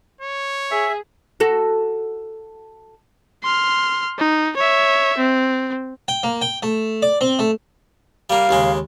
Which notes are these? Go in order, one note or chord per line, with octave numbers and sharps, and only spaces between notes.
C#5
G#4 E5
F#4 A4
C6 F6
D#4
C#5 E5
C4
G5
A#3
G5
A3
D5
C4
A3
G3 A#3 F5
D#2 C#3 G#3